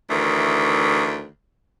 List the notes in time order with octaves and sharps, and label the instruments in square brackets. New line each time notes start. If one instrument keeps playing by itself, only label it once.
[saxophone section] D2 D#3 E3